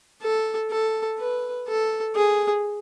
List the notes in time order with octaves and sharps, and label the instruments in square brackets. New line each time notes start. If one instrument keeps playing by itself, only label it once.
[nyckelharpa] A4
A4
B4
A4
G#4